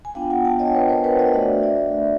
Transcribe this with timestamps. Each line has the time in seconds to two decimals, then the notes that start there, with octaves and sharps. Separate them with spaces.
0.05 G#5
0.15 B3 D4 F4 F5 G5
0.30 F#5 G#5
0.45 G5 A5
0.59 C#5 D#5
0.75 B4 C#5
0.89 A#4 C5
1.04 B4 C#5
1.19 C#5 D#5
1.34 A3 D4 F#4 D5 E5
1.63 D5 E5